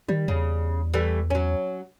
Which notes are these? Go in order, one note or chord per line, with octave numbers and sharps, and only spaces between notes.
D#3 G3
E2 C#3
E3 G3 A3
F#3 C#4